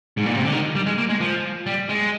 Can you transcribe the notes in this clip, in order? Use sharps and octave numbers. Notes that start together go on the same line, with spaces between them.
G#2
A#2
C3
D3
D#3
G3
G#3
A#3
G#3
F3
G3
G#3